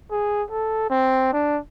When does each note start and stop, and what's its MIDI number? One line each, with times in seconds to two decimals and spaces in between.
0.11 0.43 68
0.51 0.85 69
0.90 1.28 60
1.33 1.58 62